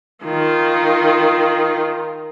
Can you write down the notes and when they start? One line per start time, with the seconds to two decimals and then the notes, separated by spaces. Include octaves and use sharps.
0.25 D#3 F4